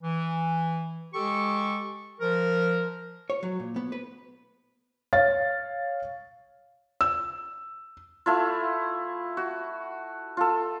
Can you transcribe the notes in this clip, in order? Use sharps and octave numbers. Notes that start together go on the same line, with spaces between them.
E3
G#3 G4 A4 C#6
F3 A#4
C#5
F#3
A#2
B3
B4
C#5 F5 A6
E6
A3 E4 F4
F#4
F4 A4